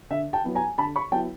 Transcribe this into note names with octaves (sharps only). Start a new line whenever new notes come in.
D3 E5
G5 A5
F#3 B3 E4
G#5 A#5
D3 A5 B5
B5 C#6
F#3 B3 E4 G5 A5